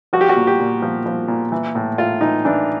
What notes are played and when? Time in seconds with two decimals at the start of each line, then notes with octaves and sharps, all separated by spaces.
0.13 F3 F#4
0.21 G4
0.29 F#4
0.36 A#2
0.47 G4
0.60 A#2
0.82 F3
1.06 F3
1.28 A#2
1.52 E3
1.75 A2
1.98 A2 F4
2.21 E3 D#4
2.45 E3 D4